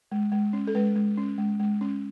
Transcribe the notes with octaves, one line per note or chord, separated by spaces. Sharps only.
G#3
G#3
C#4
A4
G#3 B4
G#3
C#4
G#3
G#3
C#4